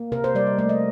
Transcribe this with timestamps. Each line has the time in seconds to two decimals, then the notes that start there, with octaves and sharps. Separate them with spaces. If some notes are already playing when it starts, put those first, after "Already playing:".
Already playing: A#3
0.12 C3 A#4
0.24 C5
0.35 G3 D5
0.47 D#5
0.58 A3 D5
0.69 D#5